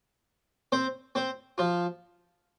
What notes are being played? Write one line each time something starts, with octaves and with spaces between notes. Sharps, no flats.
C4 C5
C4 C5
F3 F4